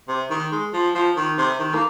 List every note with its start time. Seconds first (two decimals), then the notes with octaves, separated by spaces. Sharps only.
0.08 C3
0.30 D#3
0.52 G#3
0.73 F3
0.95 F3
1.17 D#3
1.38 C3
1.60 D#3
1.75 A#3